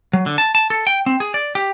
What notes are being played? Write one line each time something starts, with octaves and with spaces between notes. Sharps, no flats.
F#3
D3
A5
A5
A4
G5
C4
G#4
D5
G4